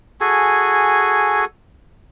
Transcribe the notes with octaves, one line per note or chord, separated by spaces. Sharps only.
F#4 G#4 A4 G#5